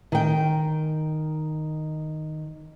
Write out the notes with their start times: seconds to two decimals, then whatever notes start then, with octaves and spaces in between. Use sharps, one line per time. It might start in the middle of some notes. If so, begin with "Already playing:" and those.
0.12 D#3 G5